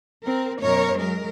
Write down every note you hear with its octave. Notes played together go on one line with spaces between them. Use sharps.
C4 A#4
F#2 B2 A#4 C#5
F#3 G#3 A#4